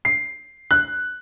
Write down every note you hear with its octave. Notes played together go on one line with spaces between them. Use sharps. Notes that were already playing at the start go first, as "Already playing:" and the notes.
C7
F#6